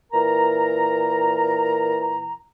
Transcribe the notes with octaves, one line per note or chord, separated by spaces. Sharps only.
A#2 E3 A#4 A#5